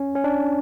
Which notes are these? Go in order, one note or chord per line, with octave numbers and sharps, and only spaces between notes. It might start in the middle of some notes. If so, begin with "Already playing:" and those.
Already playing: C#4
C#4
D4